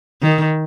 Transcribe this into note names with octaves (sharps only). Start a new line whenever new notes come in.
D#3